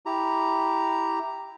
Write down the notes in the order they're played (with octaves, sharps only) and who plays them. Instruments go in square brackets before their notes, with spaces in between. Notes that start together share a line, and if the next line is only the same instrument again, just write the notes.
[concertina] E4 G4 A#5